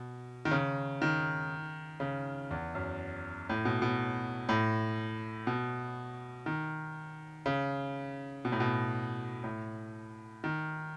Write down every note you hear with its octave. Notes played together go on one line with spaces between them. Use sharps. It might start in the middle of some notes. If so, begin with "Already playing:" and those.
Already playing: B2
D#3
C#3
D#3
C#3
E2
F#2
A2
B2
B2
A2
B2
D#3
C#3
B2
A2
B2
A2
D#3